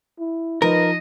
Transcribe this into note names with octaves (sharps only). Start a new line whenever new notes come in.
E4
F3 D#4 A#4 B4 D#5